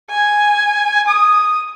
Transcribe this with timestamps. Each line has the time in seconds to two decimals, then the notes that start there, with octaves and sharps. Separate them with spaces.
0.10 G#5
1.08 D#6